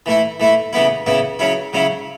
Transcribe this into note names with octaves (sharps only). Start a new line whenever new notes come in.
E3 A3 E4
E3 A3 E4
C#3 E3 B3 E4
C#3 E3 B3 E4
C#3 F#3 C#4 E4
C#3 F#3 C#4 E4